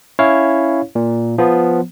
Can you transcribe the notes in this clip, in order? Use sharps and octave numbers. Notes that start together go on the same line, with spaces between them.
C#4 E4 C#5 F5
A#2
F3 B3